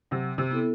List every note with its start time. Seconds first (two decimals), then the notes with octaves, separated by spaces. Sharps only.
0.11 C3 F#3
0.38 C3
0.51 B3 E4 A4